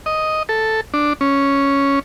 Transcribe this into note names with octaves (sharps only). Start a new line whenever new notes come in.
D#5
A4
D4
C#4